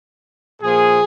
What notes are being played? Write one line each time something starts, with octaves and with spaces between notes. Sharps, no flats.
A#2 F3 G#4